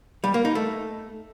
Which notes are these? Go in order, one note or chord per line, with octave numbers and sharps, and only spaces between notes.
G3
A#3
D#4
A3